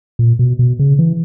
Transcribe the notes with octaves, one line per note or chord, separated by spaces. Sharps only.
A#2
B2
B2
C#3
E3